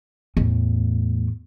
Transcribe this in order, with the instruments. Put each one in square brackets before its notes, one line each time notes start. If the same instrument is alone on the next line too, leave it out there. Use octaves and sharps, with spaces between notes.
[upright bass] E2 A2